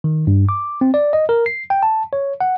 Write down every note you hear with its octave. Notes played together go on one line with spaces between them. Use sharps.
D#3
G2
D6
C4
D5
D#5
A#4
C7
G5
A5
C#5
F#5